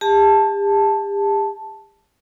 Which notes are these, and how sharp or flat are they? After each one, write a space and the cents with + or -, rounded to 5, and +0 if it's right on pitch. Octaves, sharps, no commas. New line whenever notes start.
G4 +40 A5 +0